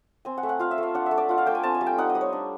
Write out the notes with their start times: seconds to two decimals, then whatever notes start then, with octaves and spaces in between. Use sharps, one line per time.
0.25 C4 G#5
0.38 F#5
0.43 A3
0.49 F#5
0.59 F4 F5
0.71 E5
0.78 A3 F5
0.94 D4 F#5
1.06 E5
1.11 A3
1.18 D5
1.29 F4 F#5
1.38 F5
1.46 A3 G5
1.55 G#5
1.63 C4 A5
1.74 G#5
1.81 G3
1.86 G5
1.98 D#4 F#5
2.10 D#5
2.15 G3
2.21 C#5
2.33 D4